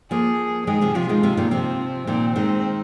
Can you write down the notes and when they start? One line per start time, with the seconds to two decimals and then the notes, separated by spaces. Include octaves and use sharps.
0.11 F3 A#3 G#4
0.67 D#3 G#3 G#4
0.81 C3 F3
0.95 C3 F3 F4
1.09 D#3 G#3
1.23 C3 F3
1.37 A#2 D#3
1.51 C3 F3 C4
2.07 A#2 D#3 C4
2.36 D#3 G#3 C4